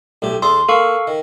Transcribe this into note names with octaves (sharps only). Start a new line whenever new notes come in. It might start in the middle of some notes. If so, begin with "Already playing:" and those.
B1 A2 G4
E2 A4 C6 D#6
A#3 A4 F5 C#6
D#3